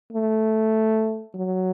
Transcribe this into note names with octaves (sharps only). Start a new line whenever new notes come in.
A3
F#3